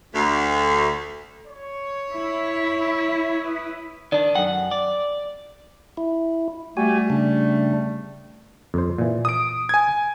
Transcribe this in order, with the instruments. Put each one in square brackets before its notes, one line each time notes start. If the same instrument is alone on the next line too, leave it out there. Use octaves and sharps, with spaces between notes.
[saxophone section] D2
[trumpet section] C#5
[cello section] E4
[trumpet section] B4 D#6
[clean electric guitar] D#3 D4 [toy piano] D5
[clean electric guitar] F#2 F#5 [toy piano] A4 G5
[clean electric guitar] D5
[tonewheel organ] E4
[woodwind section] G3 A3 [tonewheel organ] F#4 G4 G#5
[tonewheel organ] C#3 D4
[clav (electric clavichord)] F2 C5
A#2 E3
[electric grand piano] D#6 D7
G#5 G#6